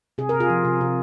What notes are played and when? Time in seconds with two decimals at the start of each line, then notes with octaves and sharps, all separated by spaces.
0.18 C3 G#4
0.29 A#4
0.34 C3
0.40 F4 G#4
0.50 F3
0.65 C3
0.81 C3